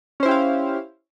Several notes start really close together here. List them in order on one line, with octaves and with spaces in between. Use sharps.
C#4 C5 E4 G4 F5